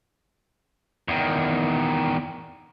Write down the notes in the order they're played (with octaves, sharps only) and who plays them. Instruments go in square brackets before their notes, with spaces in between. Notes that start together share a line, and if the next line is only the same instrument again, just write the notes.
[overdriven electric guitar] E2 D#3